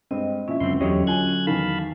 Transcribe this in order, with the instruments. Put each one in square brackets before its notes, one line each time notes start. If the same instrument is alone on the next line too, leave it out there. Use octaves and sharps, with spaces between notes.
[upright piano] G2 G#3 C4 [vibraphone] D#5
[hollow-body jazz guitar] A#2 [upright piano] F3 E4 E5 [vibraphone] C#4
[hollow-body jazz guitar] C#2 D3 C4 [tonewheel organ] F#2 C6
[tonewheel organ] E2 G4 C#5 [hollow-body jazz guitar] D3 F#3 D#5
[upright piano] F4 G#5 G7 [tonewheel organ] F#6 G#6
[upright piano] E2 D#3 [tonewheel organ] F5 A5 B5